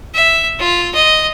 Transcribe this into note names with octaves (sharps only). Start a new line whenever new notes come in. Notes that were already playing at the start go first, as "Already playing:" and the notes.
E5
F4
D#5